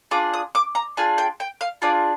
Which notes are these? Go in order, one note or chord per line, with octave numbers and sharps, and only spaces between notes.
D4 F4 G#4 D6
D#6
D6
A#5
D4 F4 G#4 G#5
G5
G5
F5
D4 F4 G#4 D5